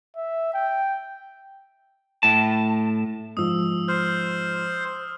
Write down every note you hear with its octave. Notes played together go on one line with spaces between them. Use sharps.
E5
G5
A2 A5
G#2 F3 D#6 E6
C5 F6